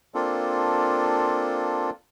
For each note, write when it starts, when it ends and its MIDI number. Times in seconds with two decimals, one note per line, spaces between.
0.15 1.90 58
0.15 1.90 60
0.15 1.90 62
0.15 1.90 65
0.15 1.90 69